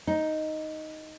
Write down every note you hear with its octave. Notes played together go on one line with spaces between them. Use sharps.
D#4